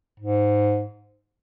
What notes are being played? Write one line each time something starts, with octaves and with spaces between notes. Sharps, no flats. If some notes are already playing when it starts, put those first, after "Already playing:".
G#2